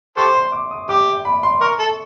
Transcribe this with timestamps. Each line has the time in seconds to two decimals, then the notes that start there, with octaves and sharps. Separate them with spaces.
0.17 G4 A4 C5 C#6
0.35 C6
0.52 D6
0.71 D#6
0.89 G4 D6
1.25 B5
1.43 C6
1.61 A#4 C#6
1.79 A4